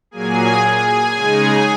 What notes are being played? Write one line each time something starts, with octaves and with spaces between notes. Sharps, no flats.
A#2 F#3 A#3 G#4 G#5
G#4 G#5
C#3 G#3 D#4